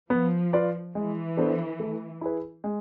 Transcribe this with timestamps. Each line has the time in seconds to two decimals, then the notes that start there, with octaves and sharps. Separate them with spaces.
0.10 F3 B3
0.53 F4 B4 D5
0.95 E3 G#3
1.37 B3 D4 A4 C5
1.80 A3
2.21 E4 G#4 B4
2.64 G#3